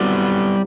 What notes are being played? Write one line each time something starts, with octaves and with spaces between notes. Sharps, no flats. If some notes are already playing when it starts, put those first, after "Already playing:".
Already playing: C2 B2 F#3 G3 B3 C4 E4